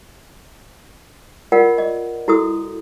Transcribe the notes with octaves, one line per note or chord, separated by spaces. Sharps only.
F4 A#4 D5 F#5
D#5
E4 F#4 A4 D#6